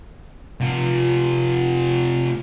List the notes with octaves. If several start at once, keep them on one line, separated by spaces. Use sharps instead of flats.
C3 F4